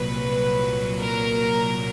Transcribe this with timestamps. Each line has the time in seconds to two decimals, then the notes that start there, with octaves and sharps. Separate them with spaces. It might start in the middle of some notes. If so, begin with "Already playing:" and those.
Already playing: C2 A#2 F#3 B4
0.99 A#4